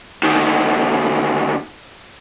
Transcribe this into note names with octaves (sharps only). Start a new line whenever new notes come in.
D2 D#3